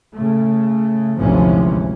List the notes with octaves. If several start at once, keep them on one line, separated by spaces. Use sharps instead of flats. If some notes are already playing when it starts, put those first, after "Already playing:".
C#3 A3
G#1 D2 C3 E3 F3 C#4